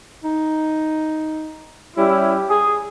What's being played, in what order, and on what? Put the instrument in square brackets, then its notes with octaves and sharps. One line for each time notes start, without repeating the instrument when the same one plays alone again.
[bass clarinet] D#4
[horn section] G3 C#4 E4 [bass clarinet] G4
[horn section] G#4